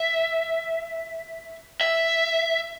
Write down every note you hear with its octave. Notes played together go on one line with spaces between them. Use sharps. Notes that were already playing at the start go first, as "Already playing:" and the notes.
Already playing: E5
E5